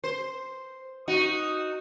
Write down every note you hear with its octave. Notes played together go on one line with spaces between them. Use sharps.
C5
D#4 F#4